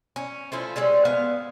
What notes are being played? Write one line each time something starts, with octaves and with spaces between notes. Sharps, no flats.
C#4
F3 A3 C#4 E4
G3 G#3 C4 C#4
B3 F5